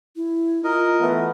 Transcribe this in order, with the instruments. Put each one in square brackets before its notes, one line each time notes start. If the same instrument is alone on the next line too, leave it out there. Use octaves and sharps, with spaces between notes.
[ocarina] E4
[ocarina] F4 [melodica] A#4 D#5
[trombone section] E3 A3 B3